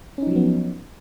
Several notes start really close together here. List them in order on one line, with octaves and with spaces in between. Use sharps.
C#4 D#4 F3 F#3 B3